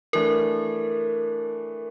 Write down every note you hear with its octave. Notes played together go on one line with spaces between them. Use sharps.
E3 A3 D4 A#4